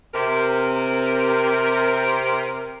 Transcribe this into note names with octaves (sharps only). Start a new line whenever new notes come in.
C3 A#4